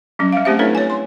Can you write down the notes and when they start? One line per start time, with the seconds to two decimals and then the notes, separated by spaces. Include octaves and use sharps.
0.19 F#3 G3 C#4
0.32 G3 F5
0.45 A3 C4 C#4 G4 C5 E5
0.59 C4 D4 E4 A4 B4 C#5
0.75 C#5 G#5
0.90 C6